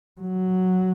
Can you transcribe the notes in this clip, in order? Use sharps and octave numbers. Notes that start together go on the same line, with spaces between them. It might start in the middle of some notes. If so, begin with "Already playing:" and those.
F#3